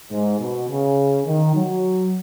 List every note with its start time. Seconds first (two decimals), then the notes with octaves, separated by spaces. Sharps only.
0.10 G#2
0.39 B2
0.69 C#3
1.26 D#3
1.55 F#3